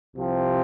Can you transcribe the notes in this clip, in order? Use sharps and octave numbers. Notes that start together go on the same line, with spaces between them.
C2 C3 F3 C4